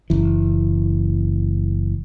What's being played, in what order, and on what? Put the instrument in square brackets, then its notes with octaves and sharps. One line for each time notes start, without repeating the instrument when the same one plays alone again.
[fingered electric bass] F#1 E3